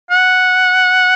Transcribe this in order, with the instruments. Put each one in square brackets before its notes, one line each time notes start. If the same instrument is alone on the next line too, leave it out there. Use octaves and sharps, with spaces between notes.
[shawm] F#5